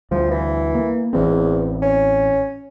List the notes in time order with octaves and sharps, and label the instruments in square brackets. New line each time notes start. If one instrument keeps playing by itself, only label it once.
[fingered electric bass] D2 G3 [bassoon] F3
[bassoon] E3
[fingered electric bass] A#3
[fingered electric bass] A1 E3 C4 [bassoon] E2
[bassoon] C#4